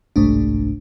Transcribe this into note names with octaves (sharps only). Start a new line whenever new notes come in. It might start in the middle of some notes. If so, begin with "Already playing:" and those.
G1 C2 G#2 A3 D4